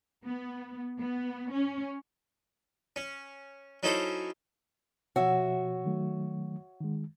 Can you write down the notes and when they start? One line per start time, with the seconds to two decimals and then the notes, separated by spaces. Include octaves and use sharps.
0.25 B3
1.00 B3
1.53 C#4
2.96 C#4
3.83 F#3 C#4 D#4 E4 A4 C5
5.16 B2 F3 F#4 C#5 E5
5.85 D#3 F#3 A3
6.81 D#3 G#3